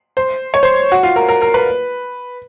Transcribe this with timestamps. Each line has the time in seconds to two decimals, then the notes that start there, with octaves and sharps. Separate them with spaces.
0.17 C5
0.54 C#5
0.63 C5
0.92 F#4
1.03 F4
1.16 A#4
1.29 A#4
1.41 A#4
1.54 B4